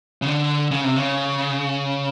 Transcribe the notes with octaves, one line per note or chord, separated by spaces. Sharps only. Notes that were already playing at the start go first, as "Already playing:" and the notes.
C#3
D3
C#3
C3
C#3